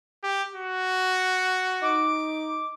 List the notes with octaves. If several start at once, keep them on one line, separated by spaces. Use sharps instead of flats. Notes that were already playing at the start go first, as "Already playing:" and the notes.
G4
F#4
D#4 D6